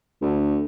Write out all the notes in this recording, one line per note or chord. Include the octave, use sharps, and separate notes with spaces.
D2